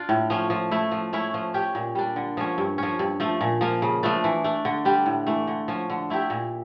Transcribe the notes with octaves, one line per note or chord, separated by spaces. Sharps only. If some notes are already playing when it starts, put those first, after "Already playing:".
Already playing: D4 F4
A2
F3 C#4
F3
A3 E4
F3
A3 C#4 E4
F3
C#4 G4
A#2
G3 D4
D3
F3 C#4
G2
F3 C#4
G2
F3 A3
A#2
F3 A#3
C#3
F3 A3 D4
E3
A3 D4
D3
G3 D4 G4
A2
E3 A3
D3
F3 C#4
D3
A3 E4 G4
A#2